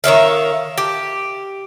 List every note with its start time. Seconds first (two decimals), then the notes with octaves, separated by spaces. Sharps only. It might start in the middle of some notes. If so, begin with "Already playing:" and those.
0.04 D#3 C#5 E5 F5
0.78 G4